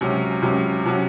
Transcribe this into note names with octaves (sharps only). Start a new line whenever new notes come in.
C#2 C3 F#3 C#4
C#2 C3 F#3 C#4
C3 F#3 C#4 F#4